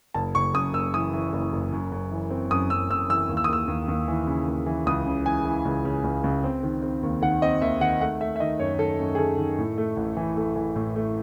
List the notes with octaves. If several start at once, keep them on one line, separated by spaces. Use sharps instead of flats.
F#1 A5
F#1 C#6
F#2 D#6
F#1 E6
E3 D#6
E3
F#1
F#1
F#2
F#2
E3
C4
F#2 D#6
F#2 E6
F#2 E6
E3 E6
D#2
E6
D#6
D#2 E6
D#2
D#2
E3
C#3
D#2
E3
C#2 D#6
C#3
E3 G#5
E3
C#2
C#3
C#2
C#2
C4
D#3
C4
D#2
D#3 F#5
C4 D#5
D#2 E5
D#3 F#5
A3 F#5
A3 E5
E5
D#3 D#5
F#2 C#5
D#3 A4
F#2
G#4
D#3 A4
D#3
A2
A3
A1
E3
A3
E3
A2
A3